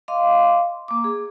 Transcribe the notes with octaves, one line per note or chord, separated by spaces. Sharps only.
D#5 F5 C6 D6
A#3 D6
G#4